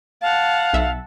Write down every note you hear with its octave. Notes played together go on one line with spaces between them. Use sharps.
F5 F#5 A5
B1 E5